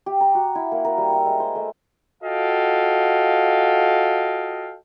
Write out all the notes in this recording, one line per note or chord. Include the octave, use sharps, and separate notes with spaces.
G4
A#5
F#4
E4
A#3
A#4
G3
E5
G#3
C5
A3
F4 F#4 A4 D#5 F5 G5